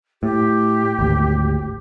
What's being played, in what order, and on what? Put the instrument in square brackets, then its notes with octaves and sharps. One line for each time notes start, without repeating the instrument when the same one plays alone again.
[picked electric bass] A2 [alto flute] G4
[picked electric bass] G#1 D2